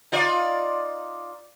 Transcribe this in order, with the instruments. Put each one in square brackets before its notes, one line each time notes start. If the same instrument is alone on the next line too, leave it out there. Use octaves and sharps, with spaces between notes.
[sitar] D#4 F4 D5